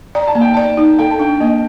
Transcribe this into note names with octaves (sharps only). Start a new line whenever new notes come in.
D5 A#5
A5
A#3
G5
D5 A5
D#4
A4 G5
A5
D4 G5
A#3 D#5